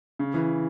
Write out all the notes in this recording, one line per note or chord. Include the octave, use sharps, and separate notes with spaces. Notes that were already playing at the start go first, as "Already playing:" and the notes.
C#3
E3